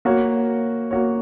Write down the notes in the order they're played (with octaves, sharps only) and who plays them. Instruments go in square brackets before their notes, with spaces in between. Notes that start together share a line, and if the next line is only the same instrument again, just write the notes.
[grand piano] A#3 F#4 C#5
A#3 F#4 C#5